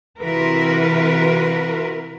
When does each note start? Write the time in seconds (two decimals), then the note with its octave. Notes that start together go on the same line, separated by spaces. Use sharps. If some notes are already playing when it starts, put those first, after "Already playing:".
0.21 C3 E3 F4 F#4 A#4 B4